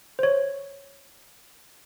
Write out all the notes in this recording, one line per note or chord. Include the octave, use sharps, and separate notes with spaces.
C5 C#5